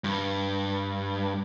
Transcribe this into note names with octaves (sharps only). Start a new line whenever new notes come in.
G2